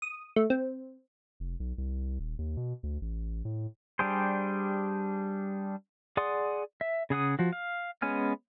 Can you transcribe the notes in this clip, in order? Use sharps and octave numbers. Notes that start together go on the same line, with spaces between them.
D#6
A3
C4
F1
B1
C2
D#1
D#2
B2
D2
A1
A2
G3 D4 G4 G#4 C5
G#4 D5 F#5 C6 D#6
E5
C#3 G#4 F#5 D#6
F3 F#4
F5
G#3 B3 C#4 G#5 F6